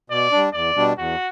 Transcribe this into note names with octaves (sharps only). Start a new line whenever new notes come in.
B2 D5
G3 D4
E2 D5
B2 G3 D4
E2 F#4